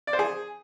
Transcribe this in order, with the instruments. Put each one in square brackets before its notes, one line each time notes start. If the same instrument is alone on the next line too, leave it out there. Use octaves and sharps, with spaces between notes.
[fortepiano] D5
C5
G#4